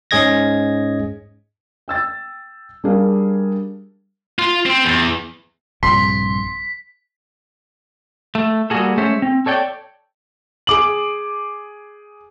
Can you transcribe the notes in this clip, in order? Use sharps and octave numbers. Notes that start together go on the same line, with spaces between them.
G#2 C#4 G#4 D#5 G#6 A#6
G5 E6 A6
G3 D4 G#4 A#4 F5
F4
C4
E2
A#1 G2 C3 C6 B6
A3
G3 A#3 B3 F#4 G#4 A4
G#3 A3 C#4 C5 C#5 E5
C4
A4 C#5 D5 G5
G#4 D6 F#7